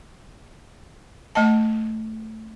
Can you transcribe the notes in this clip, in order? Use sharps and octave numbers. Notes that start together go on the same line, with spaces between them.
A3 D#5 A5